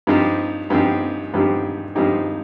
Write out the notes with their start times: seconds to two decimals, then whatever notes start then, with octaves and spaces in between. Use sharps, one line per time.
0.07 G2 F3 C4 D#4 G4
0.70 G2 F3 C4 D#4 G4
1.34 G2 F3 C4 D#4 G4
1.95 G2 F3 C4 D#4 G4